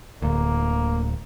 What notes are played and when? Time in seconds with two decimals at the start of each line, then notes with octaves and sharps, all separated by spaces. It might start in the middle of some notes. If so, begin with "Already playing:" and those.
0.22 D1 D2 A#3